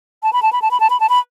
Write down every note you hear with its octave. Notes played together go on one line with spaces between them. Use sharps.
A5
B5
A5
B5
A5
B5
A5
B5
A5
B5